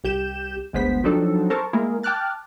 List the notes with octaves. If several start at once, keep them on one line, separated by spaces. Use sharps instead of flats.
C2 G4 G6 E7
G1 D2 G#3 B3 C5 B6
F3 F#3 C4 D4 D#4 A4
A4 A#4 C5 A5 C#6
G#3 A#3 E4 G#4 A#4
G5 A5 D6 F6 F#6 A6